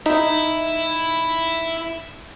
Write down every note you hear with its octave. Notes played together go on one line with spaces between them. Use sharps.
D#4 E4